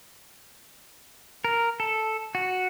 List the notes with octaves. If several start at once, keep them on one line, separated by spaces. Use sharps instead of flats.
A#4
A4
F#4